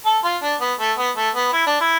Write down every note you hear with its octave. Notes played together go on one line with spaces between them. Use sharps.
A4
F4
D4
B3
A3
B3
A3
B3
E4
D4
E4